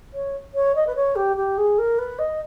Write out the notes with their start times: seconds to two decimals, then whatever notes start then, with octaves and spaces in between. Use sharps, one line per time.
0.13 C#5
0.54 C#5
0.75 D#5
0.87 B4
0.95 C#5
1.15 G4
1.36 G4
1.57 G#4
1.78 A#4
1.98 B4
2.18 D#5